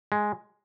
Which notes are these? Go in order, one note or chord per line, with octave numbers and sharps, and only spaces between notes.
G#3